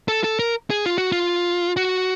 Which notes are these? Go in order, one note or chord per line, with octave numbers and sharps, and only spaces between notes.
A4
A4
A#4
G#4
F4
F#4
F4
F#4